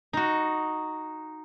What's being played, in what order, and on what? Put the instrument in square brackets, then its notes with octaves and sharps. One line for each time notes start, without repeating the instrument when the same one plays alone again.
[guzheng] D#4 F#4